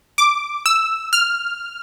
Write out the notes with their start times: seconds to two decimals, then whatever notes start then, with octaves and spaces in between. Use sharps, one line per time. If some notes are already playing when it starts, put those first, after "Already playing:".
0.18 D6
0.66 E6
1.13 F6